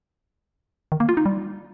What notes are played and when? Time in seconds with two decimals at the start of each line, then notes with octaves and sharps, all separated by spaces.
0.92 D#3
1.00 A#3
1.09 F4
1.17 D#4
1.26 G3